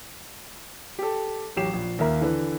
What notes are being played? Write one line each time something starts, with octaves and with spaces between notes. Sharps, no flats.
G4 A4
A1 F#3 G4 C7 E7
A#1
D#2 A#3 A#4 E5 A#5
D3 E3 B4